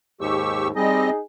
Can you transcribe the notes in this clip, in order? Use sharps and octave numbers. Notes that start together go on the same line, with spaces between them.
D#2 G#2 G4 C#6 E6
G3 C4 D#4 G#4 D#5